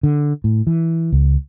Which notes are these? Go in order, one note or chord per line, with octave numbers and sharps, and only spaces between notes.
D3
A2
E3
C#2